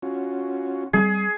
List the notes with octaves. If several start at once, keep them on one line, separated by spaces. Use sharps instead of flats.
C#4 F4 F#4
F#3 G3 C4 G#4